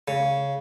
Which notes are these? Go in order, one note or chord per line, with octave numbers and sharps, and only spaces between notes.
C#3